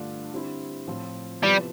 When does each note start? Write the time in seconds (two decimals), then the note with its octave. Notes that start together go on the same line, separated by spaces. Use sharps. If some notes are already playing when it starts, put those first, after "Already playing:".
Already playing: G2 D3 A3 D4 F4
0.31 D3 G3 C4 E4
0.87 A2 F3 C4 F4
1.43 C3 F3 G3 B3 E4